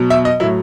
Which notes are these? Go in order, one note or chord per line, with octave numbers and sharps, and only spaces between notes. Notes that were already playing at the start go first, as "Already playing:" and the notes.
Already playing: B2 F#3
E5
D#5
A2 F#3 E4